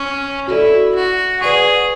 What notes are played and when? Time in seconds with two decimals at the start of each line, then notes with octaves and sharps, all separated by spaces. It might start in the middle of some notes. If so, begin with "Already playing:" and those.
Already playing: C#4
0.48 E4 F#4 A4 D5
0.95 F#4
1.41 G#4 B4 D5 F#5 C#6